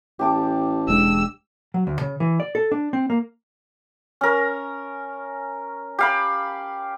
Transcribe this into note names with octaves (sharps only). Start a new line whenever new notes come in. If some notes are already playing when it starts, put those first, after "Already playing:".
A1 G4 A5 D6
E1 G#3 D4 E6
F#3
D2
C#3
E3
D5
A4
D4
C4
A#3
C#4 A#4
G4 F5 B5